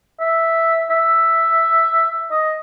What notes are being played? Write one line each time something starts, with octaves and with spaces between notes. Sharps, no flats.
E5
E5
D#5